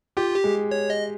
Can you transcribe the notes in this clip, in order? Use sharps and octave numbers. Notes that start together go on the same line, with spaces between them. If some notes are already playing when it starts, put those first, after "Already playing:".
F4 G4
G4
G#3
C#5
D#5